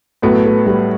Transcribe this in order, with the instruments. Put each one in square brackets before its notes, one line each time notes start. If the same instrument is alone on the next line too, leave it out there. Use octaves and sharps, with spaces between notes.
[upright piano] A2 F#3 B3 F#4 [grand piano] A3
[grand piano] A3
G3